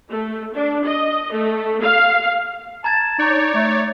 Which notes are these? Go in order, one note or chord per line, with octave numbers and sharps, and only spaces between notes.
A3
D4
D#5
A3
F5
A5 A#5 G#6 A6
D#4 C#5 D5
A3